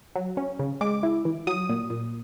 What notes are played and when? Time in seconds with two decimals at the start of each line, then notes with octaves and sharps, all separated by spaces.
0.16 F#3
0.37 C#4
0.59 C#3
0.81 G#3 D6
1.03 E4
1.25 E3
1.47 F#3 D#6
1.69 A#2
1.90 A#2